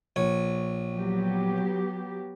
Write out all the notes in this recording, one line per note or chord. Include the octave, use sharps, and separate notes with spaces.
A#1 C#5
F#3 B3 G4